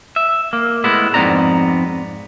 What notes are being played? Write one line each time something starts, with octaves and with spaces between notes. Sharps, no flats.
E5
A#3
A2 G#3 B3 E4
F2 G#2 B3 C4 D5 A#5